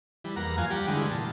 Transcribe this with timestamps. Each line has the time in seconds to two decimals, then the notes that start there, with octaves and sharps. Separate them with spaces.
0.24 E3 G3
0.36 E2 A#3 F#5 A#5
0.58 F#2 F3 F5 G#5
0.71 G3 G4 F#5
0.88 D3 E3 G#3
1.11 A#2 A5